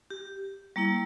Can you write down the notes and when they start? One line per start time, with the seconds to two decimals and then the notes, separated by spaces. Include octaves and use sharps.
0.10 G4
0.76 G3 A#3 E4